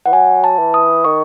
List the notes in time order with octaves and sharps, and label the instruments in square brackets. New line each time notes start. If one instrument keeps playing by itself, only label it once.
[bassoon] E3 [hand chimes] F#5
[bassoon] F#3 [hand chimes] G#5
[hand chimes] A5
[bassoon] E3
[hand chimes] D#6
[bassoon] D#3 [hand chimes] C#6